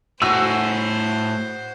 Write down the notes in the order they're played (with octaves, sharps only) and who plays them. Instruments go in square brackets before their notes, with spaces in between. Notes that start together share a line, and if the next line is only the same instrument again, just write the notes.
[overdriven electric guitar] A2 G#4 [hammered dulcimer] F#4 [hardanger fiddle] C5 [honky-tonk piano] E6